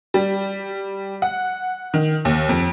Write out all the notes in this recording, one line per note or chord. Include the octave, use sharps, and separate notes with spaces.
G3
F#5
D#3
D#2
F2